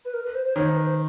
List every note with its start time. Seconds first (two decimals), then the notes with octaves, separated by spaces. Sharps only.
0.05 B4
0.14 A#4
0.24 B4
0.35 C5
0.45 C5
0.55 D#3 C#5
0.66 C5
0.76 B4
0.86 C5